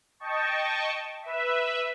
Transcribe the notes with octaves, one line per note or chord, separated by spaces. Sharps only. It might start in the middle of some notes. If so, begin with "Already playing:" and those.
D#5 G5 A5 C#6
B4 E5